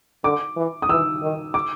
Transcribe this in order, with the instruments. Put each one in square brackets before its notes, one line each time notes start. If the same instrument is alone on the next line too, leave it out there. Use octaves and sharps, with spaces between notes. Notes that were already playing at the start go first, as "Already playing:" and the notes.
[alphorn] D3 [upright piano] D6
[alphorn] E3
[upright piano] D#6
[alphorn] E3 [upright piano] E6
[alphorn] D#3
[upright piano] D6